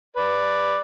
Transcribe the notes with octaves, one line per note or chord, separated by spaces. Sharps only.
B4 D5